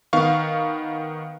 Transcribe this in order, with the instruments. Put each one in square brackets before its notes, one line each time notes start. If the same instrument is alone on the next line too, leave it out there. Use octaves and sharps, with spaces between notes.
[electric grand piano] D#3 B3 F5 C#6